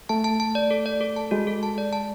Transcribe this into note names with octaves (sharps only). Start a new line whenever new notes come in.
A3 A5
A5
A5
D5
A4
D5
A4
A5
G#3 F#4
A4
A5
D5
A5